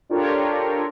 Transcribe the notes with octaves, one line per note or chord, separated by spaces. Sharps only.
D4 F4 G4 A4 A#4 C#5